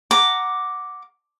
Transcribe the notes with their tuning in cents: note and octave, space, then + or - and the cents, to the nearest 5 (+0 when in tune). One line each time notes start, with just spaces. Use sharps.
F#5 +0 A#5 +0 D6 +0